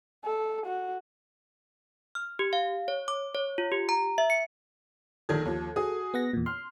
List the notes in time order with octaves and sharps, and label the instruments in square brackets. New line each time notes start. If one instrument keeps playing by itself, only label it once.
[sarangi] A4
F#4
[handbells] F6
G4
F5
C#5
D6
C#5
F4
G4
A#5
E5
C#7
[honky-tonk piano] A#1 D#3 G#6 [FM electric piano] A4
[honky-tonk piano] D#2 F3
F#4 G#4 D#6
[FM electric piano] B3 F#5 A#6
E2 A#2
[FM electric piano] C6 [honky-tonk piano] F6